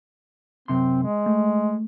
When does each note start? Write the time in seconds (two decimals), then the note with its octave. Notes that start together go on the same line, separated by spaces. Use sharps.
0.68 F#2 C3 C4 C6
1.03 G#3
1.26 A3